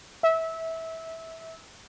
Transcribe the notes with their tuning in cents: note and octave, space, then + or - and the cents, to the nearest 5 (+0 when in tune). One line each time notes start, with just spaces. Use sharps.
E5 -20